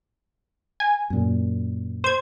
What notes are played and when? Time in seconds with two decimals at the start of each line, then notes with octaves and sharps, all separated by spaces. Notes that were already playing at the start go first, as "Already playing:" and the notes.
0.80 G#5
1.10 F#2 A#2
2.04 C5 G#6